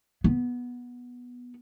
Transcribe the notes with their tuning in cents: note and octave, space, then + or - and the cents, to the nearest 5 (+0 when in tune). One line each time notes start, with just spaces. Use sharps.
B3 -10